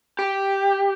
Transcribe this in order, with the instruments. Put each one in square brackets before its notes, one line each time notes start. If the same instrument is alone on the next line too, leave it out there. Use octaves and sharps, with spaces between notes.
[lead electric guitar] G4